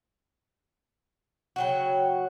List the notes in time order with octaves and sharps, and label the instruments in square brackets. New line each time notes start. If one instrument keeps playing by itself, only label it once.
[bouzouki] C#3 F#3 F#4 [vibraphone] F#5 G5